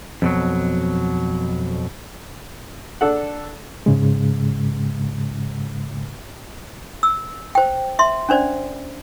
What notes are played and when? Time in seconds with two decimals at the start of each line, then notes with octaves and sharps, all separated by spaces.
0.22 F2 B2 F#3
3.01 D4 A4 F#5
3.86 G#2 C#3 G#3
7.03 E6
7.55 C5 G5
7.99 E5 C6
8.29 C#4 D4 C5 D5